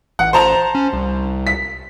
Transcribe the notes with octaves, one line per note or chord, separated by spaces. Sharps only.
A1 F#5
C5 A5 A#5
C#4
C2
B6